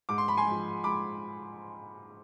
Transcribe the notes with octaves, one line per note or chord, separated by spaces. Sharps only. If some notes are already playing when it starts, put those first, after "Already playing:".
G#2 D6
C6
B5
G#5 C6
F3 G#3
G#2 B5 D6